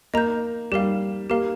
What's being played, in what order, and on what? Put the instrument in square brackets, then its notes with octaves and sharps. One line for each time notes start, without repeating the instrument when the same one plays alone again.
[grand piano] A#3 [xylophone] D#5 A#5 G6
[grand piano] G3 [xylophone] G4 A#4 F5
[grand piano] A#3 [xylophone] G4 A#4 F5